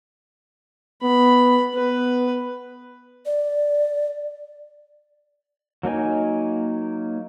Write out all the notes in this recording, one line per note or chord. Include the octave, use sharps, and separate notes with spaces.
B3 B5
B3 B4
D5
F#3 A#3 D#4 G#5